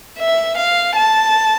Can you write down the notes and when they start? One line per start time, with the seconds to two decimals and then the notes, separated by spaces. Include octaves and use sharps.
0.19 E5
0.57 F5
0.96 A5